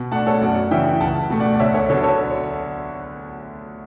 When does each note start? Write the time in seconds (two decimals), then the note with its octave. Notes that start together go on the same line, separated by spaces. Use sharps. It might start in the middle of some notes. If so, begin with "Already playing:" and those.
Already playing: B2
0.11 A3 F#5 A5
0.15 D4
0.27 A4 C#5
0.41 F#2 D5 F#5
0.71 C#3 E3 E5 G5
1.00 C#2 F#5 A5
1.30 B2 A3
1.40 D5 F#5
1.54 D5
1.60 D2 C#5 E5
1.74 A4 C#5
1.89 D3 F#3 B3 A4 C#5
2.03 A4 C#5